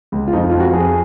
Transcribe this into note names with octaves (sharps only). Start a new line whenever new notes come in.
C#2
F4
F2 D#4
F2 F4
F#4
F2 G#4